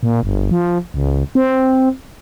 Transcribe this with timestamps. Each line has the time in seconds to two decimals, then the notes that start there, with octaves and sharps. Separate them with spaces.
0.03 A#2
0.23 G1
0.51 F3
0.94 C#2
1.35 C4